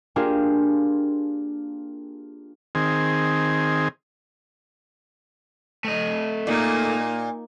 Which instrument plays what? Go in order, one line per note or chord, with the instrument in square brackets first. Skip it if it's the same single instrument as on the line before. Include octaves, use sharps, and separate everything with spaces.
[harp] A#3 D4 F4 G4 G#4
[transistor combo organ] D#3 C4 G#4
[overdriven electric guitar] A3 D#5
[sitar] A#2 [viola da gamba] A#3 D#4